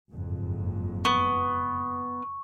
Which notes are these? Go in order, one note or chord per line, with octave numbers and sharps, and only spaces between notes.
F#1 F2 G#2
B3 C#6